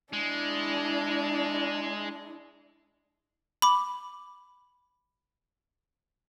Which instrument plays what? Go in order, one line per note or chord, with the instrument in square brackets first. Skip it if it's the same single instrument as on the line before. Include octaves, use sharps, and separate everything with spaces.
[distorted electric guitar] G#3 [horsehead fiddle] D4 E4
[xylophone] B5 D6